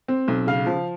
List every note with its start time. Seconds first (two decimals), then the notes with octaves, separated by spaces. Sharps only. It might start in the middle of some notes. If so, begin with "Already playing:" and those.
0.08 C4
0.28 B1
0.47 C#3 F5
0.66 F3